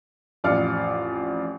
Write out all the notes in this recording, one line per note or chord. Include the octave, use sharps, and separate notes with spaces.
A1 F2 D5 F5 F6 C#7